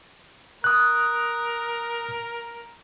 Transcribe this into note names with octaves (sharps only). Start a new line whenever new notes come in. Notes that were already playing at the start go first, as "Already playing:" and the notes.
A#4 D#6 F#6